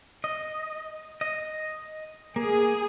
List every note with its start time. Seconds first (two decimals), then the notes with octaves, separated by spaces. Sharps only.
0.24 D#5
1.21 D#5
2.36 A#3 G#4